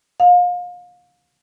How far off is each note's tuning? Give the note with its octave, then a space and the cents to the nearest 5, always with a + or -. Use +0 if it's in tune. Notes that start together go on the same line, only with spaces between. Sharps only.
F5 +35